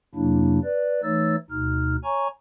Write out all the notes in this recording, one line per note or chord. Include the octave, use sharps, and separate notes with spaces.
F2 C3 F#3 A#3 D4 E4
B4 D5
E3 A3 D#4 C#5 E6 A6
D2 B2 D#4 F6
C#5 G#5 A#5 C#6